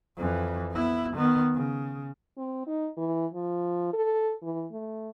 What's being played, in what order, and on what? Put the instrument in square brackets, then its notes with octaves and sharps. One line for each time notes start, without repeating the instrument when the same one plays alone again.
[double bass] F2 E3
B3 E4
D#3 B3
C#3
[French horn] C4
D#4
E3
F3
A4
E3
A3